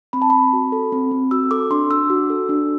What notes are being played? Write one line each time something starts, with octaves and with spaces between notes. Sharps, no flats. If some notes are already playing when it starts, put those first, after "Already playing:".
C4 B5
A5
C4 B5
F#4
A4
C4
C4
F#4 E6
A4 D6
D4 C6
D4 E6
F#4
A4
D4